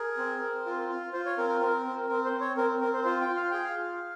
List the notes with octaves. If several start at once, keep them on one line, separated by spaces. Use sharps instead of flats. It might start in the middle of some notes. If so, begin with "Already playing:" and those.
Already playing: G#4 A#4
C4
C4
F4
F4
F4 C5
C#5
C4 A#4
A#4
C4 A#4
C4
C4 A#4
C5
C4
C#5
C4 A#4
C4 A#4
C5
F4 C5
G5
F4
F5
G#4 G5
F5
F4